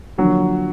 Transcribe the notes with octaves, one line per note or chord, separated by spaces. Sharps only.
D3 F3 F#3 A#3 D4 F#4